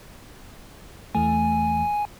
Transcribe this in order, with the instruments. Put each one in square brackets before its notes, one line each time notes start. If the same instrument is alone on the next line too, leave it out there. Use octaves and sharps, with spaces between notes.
[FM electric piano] E2 E3 A3 [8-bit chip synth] G#5